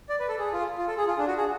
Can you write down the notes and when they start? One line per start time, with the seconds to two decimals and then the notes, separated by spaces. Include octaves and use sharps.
0.09 D5
0.20 B4
0.29 A4
0.39 G#4
0.53 F4
0.78 F4
0.87 A4
0.98 G#4
1.07 F4
1.18 D4
1.27 F#4
1.38 G#4